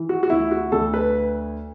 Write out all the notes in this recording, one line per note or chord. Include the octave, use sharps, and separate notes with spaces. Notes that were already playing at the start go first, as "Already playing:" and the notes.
Already playing: E3
F#4
F#4
D2 E4
F#4
D2 A4
B4